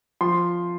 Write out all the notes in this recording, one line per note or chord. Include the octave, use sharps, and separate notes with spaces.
F3 C6